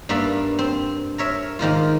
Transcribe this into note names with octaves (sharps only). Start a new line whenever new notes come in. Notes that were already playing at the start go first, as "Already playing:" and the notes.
G2 A#3 B3 D5 E5
C4
A#4 C#5 E5
G#2 D#3 A#3 F4